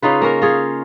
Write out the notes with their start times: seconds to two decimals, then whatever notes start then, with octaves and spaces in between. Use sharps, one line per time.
0.02 C#3 D#4 F4 B4
0.22 A#3 C#4 A#4
0.42 F4 G#4 C#5